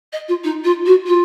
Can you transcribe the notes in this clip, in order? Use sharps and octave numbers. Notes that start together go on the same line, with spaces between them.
D#5
F4
D#4
F4
F#4
F4